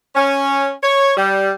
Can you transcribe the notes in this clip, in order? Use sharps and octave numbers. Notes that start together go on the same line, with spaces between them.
C#4
C#5
G3